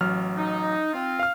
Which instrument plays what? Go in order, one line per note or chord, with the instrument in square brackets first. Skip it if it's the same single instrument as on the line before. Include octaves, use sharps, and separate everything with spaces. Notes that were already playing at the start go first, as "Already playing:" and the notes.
[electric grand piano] A1 F#3 F6
[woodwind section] D#4
C4 F4
[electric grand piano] F5 F6